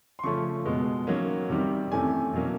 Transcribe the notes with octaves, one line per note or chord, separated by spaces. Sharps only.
C6
C#3 F3 A3 C#4 C#6
B2 G#3 B3
D#3 F#3 A#3 C#4
C3 D#3 G3
C3 E3 A3 C#4 G#5
B2 F#3 A#3 C#4